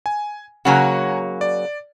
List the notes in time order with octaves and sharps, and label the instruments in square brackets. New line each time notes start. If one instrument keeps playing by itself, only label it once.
[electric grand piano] G#5
[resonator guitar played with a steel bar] C#3 F#3 A#3 [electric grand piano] F#5 G#5 A#5
[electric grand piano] D5